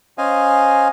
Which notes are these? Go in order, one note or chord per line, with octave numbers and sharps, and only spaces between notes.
C#4 C5 D#5 F5 G#5